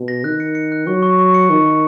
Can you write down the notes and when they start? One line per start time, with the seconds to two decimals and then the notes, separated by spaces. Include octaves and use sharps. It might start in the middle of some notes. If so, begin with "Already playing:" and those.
Already playing: B2
0.08 A#6
0.24 D#3 F#6
0.40 C#7
0.55 C#7
0.72 F#6
0.87 F#3 C#6
1.02 C#6
1.19 C#6
1.34 C#7
1.50 D#3 C#6
1.65 C#6